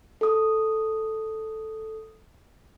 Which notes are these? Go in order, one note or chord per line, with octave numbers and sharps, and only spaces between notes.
A4 D#6